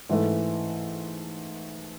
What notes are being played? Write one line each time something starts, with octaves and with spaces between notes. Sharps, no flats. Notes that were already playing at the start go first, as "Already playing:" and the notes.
G#2 E3 A3